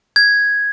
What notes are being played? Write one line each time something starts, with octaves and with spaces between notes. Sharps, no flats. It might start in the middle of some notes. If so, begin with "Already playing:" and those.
G#6